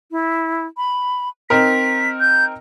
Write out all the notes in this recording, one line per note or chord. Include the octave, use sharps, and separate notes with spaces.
E4
B5
C4 D#4 A#4 B6
G6